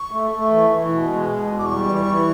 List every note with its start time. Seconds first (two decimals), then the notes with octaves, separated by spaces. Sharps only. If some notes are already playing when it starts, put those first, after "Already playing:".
Already playing: C#6
0.11 A3
0.31 A3
0.50 E3
0.70 E3
0.89 B2
1.09 G#3
1.28 B2
1.47 E2
1.59 D6
1.66 G3 C#6
1.86 E3
2.06 E3